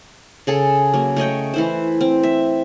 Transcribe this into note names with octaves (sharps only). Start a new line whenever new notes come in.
C#3 G#4 A4
F#3 A#3
A3 C#5 D#5 G5
E3 E4 C5
C4
E5